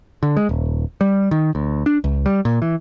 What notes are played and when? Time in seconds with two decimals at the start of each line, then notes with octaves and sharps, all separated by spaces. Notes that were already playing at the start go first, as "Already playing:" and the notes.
0.23 D3
0.37 G#3
0.49 D#1
1.01 G3
1.31 D#3
1.55 D2
1.86 D4
2.04 C#2
2.26 G3
2.45 A#2
2.62 E3